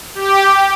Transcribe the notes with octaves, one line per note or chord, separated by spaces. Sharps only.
G4